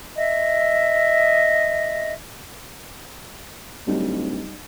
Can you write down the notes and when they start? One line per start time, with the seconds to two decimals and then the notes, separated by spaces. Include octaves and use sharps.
0.16 D#5 E5
3.87 D1 G3 D#4